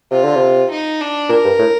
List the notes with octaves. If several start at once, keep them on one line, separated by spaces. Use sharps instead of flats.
C3 F4
D3
C3
D#4
D4
A#2 A#4
G2
A2